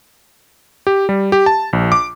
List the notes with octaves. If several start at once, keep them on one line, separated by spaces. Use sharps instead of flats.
G4
G3
G4
A5
A#1
D6